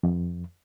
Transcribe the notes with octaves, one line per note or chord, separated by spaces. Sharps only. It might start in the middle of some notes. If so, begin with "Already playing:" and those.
F2